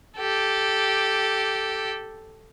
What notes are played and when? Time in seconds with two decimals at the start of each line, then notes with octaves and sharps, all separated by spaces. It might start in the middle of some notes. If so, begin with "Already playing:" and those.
0.18 G4 A4